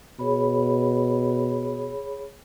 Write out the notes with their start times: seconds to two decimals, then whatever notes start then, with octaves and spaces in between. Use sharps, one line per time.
0.19 B2 G#4 C#5 B5